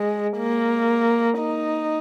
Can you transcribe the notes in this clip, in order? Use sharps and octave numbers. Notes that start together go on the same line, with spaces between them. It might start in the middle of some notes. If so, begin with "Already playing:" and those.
Already playing: G#3
A#3
D#4